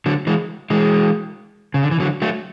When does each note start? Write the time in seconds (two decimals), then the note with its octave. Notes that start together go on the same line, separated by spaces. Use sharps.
0.06 D3 F#3
0.27 E3 G#3
0.70 E3 G#3
1.74 C#3
1.83 D3
1.91 E3
2.00 D3 F#3
2.22 F#3 A3